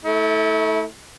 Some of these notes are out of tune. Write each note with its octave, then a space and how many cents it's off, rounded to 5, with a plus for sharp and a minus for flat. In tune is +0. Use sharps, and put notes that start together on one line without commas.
A3 +0 E4 -35